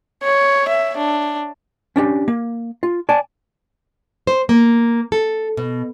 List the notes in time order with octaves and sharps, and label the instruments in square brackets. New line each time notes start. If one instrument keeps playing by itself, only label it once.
[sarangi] C#5
E5
D4
[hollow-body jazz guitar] C#4 D4 F4 G4
A#3
F4
D5 G#5 A5
[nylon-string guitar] C5
A#3
A4
B2